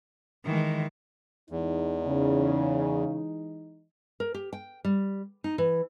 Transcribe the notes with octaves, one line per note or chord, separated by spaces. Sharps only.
D#3 E3 G#3
E2 E3 G#3 D#4
C#3
A#4
G4
G5
G3
D#4
E3